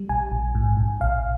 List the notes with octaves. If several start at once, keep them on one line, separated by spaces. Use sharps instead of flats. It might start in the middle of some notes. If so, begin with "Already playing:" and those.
Already playing: G3
A#1 G#5
A#1
G#2
A#1
A#1 F5